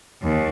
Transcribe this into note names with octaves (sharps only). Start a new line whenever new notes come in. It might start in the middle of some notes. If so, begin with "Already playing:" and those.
D#2